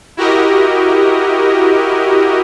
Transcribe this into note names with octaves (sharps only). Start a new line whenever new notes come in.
E4 F#4 G4 A#4 D#5